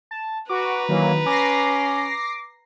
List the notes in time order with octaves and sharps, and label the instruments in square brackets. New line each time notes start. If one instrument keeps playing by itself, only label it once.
[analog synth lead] A5
[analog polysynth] F#4 [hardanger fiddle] B4 A#5 [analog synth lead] D6
[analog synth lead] D#3 [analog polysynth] E3 F#3 A#3
[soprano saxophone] C#4 [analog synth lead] D6 [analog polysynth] A#6 C7